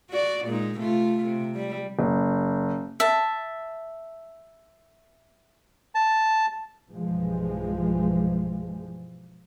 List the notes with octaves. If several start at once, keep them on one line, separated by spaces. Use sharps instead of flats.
F#4 D5
A#2 G#3 D#4
C3 A3 F4
C3
G3
F#1
E5 A5
A5
B1 G2 E3 F3 G#3